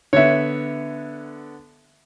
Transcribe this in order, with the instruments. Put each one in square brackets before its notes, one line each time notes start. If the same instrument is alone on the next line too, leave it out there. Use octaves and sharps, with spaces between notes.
[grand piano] D3 B3 [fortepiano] C#5 E5